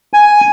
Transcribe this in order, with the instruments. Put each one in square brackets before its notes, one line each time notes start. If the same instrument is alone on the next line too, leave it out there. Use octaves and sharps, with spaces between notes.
[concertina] G#5